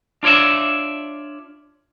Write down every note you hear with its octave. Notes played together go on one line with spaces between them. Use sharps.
D4 F4 C#5 D5 E5